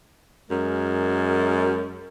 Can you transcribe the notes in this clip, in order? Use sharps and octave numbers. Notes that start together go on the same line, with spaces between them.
F#2 G#3 A#4